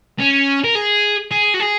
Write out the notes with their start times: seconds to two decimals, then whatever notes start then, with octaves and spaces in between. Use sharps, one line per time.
0.19 C#4
0.64 A#4
0.75 G#4
1.31 G#4
1.54 F#4
1.60 G#4